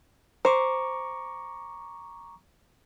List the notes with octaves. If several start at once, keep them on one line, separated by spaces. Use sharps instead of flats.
C5 A#5 C#6 D6